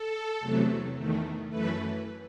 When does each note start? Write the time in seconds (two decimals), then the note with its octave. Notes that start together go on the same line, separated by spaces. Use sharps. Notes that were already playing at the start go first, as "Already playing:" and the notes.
Already playing: A4
0.40 E2 C3 F#3 A3
0.95 E2 D#3 A3
1.49 F#2 E3 A3 B4